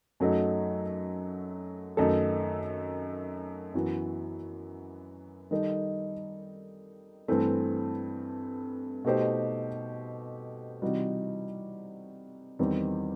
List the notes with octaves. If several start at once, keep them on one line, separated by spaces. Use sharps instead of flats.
F#2 F#3 A3 D#4
F#2 D#3 A3 D#4 A4
F#2 E3 B3 F#4
D#3 G3 D#4 A4
G2 E3 A3 C4
B2 A3 D#4 G4 C5
C3 E3 G3 D#4 F#4
E2 D#3 G3 C4